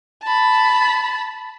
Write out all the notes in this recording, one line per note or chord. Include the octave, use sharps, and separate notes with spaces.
A5 B5